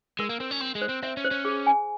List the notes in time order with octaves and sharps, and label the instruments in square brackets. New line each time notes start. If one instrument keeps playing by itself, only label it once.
[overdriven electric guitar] G#3 [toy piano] A#4
[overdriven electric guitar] A#3
[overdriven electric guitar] C4 [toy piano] A#4
[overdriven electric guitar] C#4
[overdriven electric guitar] C4 [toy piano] C6
[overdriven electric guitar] G#3
[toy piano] C5
[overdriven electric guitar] C4
[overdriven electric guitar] C4 [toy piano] E5
[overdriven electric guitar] C#4
[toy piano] C5
[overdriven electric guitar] C#4
[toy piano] G#4
G#5